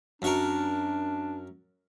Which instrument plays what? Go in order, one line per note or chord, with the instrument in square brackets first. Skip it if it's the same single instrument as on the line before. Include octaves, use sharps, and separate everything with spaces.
[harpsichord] F#2 F#4 A#4 [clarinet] D4